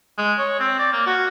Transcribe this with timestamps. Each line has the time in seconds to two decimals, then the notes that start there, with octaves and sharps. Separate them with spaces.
0.18 G#3
0.39 C#5
0.60 C4
0.78 D5
0.92 A#3
1.06 F#4